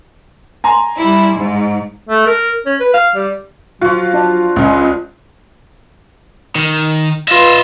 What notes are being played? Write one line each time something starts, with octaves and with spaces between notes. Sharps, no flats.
G#5 A#5 C6
G3 E4
G#2
A3
A#4
C#4
B4
F5
G3
F3 F#3 F4 F#4
D4
C#2 F3 G#3 F4
D#3
F4 B4 D#5 E5